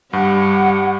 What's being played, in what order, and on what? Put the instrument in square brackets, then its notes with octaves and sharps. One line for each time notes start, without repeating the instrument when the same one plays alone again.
[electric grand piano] G2 [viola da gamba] G3 [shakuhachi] F#5